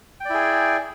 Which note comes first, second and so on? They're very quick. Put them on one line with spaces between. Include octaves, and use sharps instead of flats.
G5 D5 E4 G#4